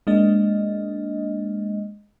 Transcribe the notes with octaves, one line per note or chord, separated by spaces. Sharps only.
G#3 A#3 D4 D#5